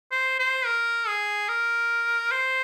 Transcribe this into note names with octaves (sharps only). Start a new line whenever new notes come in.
C5
C5
A#4
G#4
A#4
C5